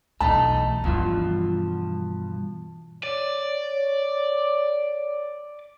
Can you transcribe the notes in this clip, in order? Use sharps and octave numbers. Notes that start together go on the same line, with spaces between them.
B1 E2 A3 D#4 A5
G2 B2 E3 F3 F4
C#5 D5